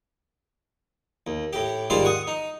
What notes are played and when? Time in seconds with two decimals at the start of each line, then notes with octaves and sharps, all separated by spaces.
1.27 D#2
1.53 A2 G4
1.90 D#2 G#2 G3 F4 C5 D5
2.05 F#5 C#6 D#6
2.27 D#4